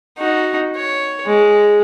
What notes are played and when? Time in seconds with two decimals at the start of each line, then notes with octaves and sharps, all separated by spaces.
0.19 D#4 F#4
0.76 C#5
1.26 G#3